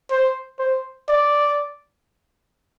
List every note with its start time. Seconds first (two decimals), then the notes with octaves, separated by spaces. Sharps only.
0.11 C5
0.59 C5
1.09 D5